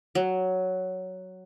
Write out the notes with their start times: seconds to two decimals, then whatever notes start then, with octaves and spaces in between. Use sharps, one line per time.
0.15 F#3